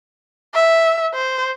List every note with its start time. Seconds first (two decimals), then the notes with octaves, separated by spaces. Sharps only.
0.54 E5
1.14 C5